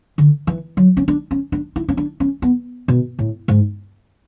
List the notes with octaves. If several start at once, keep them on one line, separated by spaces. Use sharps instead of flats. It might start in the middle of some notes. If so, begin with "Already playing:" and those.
D3
E3
F#3
C#4
D4
C#4
D4
E4
C#4
D4
C#4
B3
B2
A2
G#2